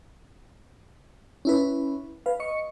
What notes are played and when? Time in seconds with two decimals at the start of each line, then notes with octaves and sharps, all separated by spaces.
1.45 C#4 E4 B4
2.26 B4 F5
2.40 D#5 C#6 C#7